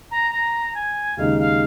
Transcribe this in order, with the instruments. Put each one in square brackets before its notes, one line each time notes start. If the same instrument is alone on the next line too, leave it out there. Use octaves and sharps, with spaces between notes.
[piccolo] A#5
A#5
G#5
[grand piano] D#2 C#3 G#3 D#4 [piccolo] F5
[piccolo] F5